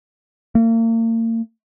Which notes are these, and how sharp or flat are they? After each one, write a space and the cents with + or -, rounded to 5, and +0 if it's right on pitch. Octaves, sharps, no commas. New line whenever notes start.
A#3 -40